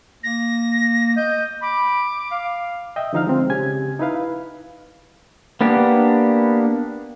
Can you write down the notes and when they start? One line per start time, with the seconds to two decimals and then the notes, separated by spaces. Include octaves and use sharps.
0.23 A#3 A#6
1.17 D#5 G6
1.62 B5 D6
2.31 F5
2.96 D#5 E5 G5
3.13 D3 F3 D#4 F5 F6
3.27 G#3 C4
3.49 C#3 G4 G#5 G#6
3.99 D#4 E4 B4 F5
5.61 A#3 B3 D4 G4